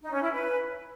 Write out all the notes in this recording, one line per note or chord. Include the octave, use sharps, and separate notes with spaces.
D#4
C#4
E4
B4